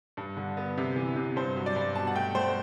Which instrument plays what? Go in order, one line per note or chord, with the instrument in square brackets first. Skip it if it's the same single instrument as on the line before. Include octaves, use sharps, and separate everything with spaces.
[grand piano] G2
D3
B3
C3
E3
C3
G2 C5
F#3
D5
G2
B2 A5
F#5
A3 G5
A3 C5